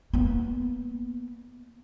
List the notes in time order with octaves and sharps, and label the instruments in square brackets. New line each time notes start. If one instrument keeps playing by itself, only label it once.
[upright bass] A#3 B3